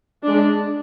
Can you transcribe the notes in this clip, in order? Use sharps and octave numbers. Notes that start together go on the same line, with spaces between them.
G#3 D4